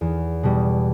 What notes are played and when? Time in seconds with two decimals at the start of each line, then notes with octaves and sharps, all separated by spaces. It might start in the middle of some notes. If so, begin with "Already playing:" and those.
0.01 E2
0.43 B2 G3